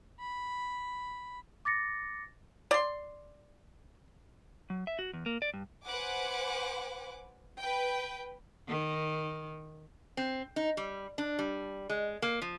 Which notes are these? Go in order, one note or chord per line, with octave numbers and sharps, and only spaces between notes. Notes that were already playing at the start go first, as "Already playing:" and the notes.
B5
D6 A6 A#6 C#7
D5 C6
F#3
E5
F#4
E2
A#3
D5
G2
B4 C5 F#5 G#5 D6
B4 G5
D#3
C4
D#4
G3
D4
G3
G#3
A#3
F3